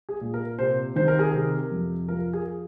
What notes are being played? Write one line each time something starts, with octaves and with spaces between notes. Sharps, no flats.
G#4
A#2
A#4
C3 C5
D#3 C5
A#4
G#4
C3 A#4
F2
F3 A#4
G#4